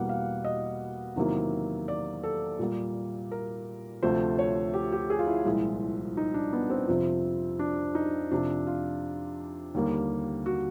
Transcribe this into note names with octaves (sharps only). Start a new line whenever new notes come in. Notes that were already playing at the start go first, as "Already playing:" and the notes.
Already playing: E2 B2 G3 A#3 F#5
F5
D#5
E2 C3 D#3 F#3 A#3
D5
A4
A#2 G3 A#3
A#4
D2 C3 F3 A3 C5
C#5
G4
G4
G#4
F4
E4
C2 A#2 F3 G#3
D#4
D4
B3
C4
F2 C3 F3
D4
D#4
F2 C3 F3 D4
F4
D#2 D3 G3 A#3
F#4